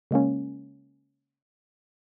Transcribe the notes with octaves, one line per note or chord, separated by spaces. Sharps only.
C#3 G#3 A#3 C#4